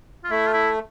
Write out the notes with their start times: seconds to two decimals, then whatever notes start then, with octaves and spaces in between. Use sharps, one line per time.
0.24 F4
0.30 A3 E4
0.47 F4
0.54 E4